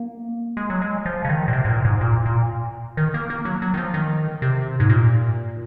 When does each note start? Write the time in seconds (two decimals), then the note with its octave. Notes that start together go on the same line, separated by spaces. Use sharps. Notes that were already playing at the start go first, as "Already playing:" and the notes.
Already playing: A#3
0.57 G#3
0.70 F#3
0.82 G#3
1.06 F3
1.25 C#3
1.29 D#3
1.48 A#2
1.53 C3
1.65 G#2
1.69 A#2
1.85 G#2
2.01 A#2
2.26 A#2
2.97 D#3
3.14 A#3
3.30 A#3
3.45 F#3
3.62 F#3
3.74 D#3
3.77 F3
3.94 D#3
4.42 C3
4.80 G#2
4.90 A#2